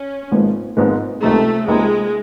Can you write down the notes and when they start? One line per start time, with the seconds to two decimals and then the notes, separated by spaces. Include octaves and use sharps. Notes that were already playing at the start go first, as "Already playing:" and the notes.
Already playing: C#4
0.31 G#1 G#2 F3 G#3 B3
0.77 G#1 G#2 F3 G#3 B3
1.22 C#2 C3 F3 A3 A#3 D#4
1.67 C#2 C3 F3 G#3 A#3 D#4